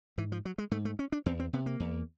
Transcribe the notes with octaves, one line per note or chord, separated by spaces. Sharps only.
G#2 E3
F3
F#3
G#3
G#2 A3
A3
C#4
D4
E2 C4
C4
C3 B3
A#3
E2